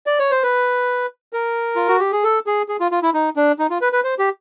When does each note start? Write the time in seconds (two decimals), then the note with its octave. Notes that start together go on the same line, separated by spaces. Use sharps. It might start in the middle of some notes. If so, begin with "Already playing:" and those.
0.07 D5
0.19 C#5
0.31 C5
0.43 B4
1.33 A#4
1.76 F4
1.88 F#4
2.00 G4
2.12 G#4
2.24 A4
2.47 G#4
2.69 G#4
2.80 F4
2.92 F4
3.02 E4
3.14 D#4
3.36 D4
3.59 D#4
3.70 F4
3.81 B4
3.93 B4
4.04 C5
4.19 G4